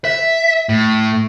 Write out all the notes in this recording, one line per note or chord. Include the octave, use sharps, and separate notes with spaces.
E5
A2